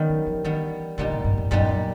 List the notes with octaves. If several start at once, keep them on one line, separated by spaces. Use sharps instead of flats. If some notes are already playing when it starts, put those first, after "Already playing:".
Already playing: D#3 G3 B3 C#4
F#3
F3
D#3 E3 G3 B3
A#2 D3 G3 B3 D#4 G4
G#2
G2
F2
F#2 A#2 G3 B3 D#4 G4
F#2